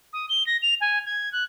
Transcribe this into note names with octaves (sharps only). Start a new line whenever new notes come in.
D#6
G7
A#6
F7
G#5
G#6
F#6